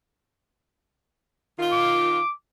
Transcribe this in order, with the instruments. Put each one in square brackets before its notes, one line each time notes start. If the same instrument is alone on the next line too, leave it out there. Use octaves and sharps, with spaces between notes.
[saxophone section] D#3 D#4 F4
[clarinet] D6